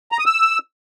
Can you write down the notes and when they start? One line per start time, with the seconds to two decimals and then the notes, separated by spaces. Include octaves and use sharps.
0.12 A#5
0.19 D#6
0.26 E6